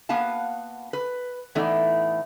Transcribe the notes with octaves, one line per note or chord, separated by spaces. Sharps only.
A#3 B3 F#4 F5 A5
B4
A2 E3 A3 B3 D#4 D5